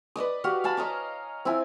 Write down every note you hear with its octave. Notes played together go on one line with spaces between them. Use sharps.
B4 D5 D#5 D#6
F#4 G4 F5
F5 G#5 A5 B5
C#5 D#5 A#5 D6
C4 E4 F4 G#5